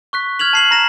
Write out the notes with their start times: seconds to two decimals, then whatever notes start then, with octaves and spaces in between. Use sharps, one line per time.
0.13 C#6 F#6 B6
0.39 F6 G#6 F7 F#7
0.53 A5 C7 F#7
0.71 A#5 A#6 E7